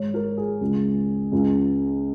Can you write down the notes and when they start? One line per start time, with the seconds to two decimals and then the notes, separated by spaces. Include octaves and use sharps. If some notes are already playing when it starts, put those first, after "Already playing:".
Already playing: G#1 G#2 G#3 C#5
0.14 A#4
0.37 G#4
0.61 C#2 C#3 G#3
1.32 C#2 C#3 G#3